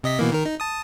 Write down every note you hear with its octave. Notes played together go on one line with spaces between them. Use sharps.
C3 D#5 B6
B2 E3 A#3
D#3 A#4
D#4
A5 D#6